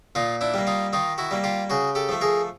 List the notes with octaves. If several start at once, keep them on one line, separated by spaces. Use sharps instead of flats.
A#2 D#4 F4
D4 E4
G3 A#3
D#4 F4
D#3 D#4 F4
E4 F#4
G3 A#3
F4 G4
C#3 F#4 G#4
G4 A4
F3 A3
G#4 A#4